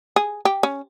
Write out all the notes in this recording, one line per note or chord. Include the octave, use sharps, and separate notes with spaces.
G#4
G4
C#4